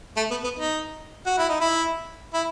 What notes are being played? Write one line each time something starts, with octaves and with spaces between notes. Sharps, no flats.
A3
B3
B3
D#4
F#4
E4
D#4
E4
E4